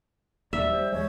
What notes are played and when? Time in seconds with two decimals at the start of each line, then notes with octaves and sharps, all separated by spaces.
0.53 D#1 D#2 D5 E5
0.70 G3 C5
0.92 E2 G#3 C#5